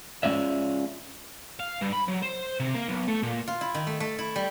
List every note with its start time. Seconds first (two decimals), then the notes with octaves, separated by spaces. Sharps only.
0.23 G#3 C#4 F4 D5 E5
1.60 F5
1.81 G2
1.93 B5
2.08 F#3
2.22 C5
2.60 C3
2.74 A#3
2.88 B1
3.08 A3
3.23 A#2
3.48 F4
3.61 E4
3.74 D#3
3.87 A3
4.00 A3
4.18 E4
4.36 G3